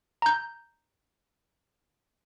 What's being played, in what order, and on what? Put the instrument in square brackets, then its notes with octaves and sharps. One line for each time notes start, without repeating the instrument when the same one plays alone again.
[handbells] A#5 G6